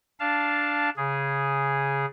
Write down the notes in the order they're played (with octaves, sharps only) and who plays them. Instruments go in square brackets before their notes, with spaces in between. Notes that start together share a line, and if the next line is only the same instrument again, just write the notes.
[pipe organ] D4 F5 A5
C#3 G#4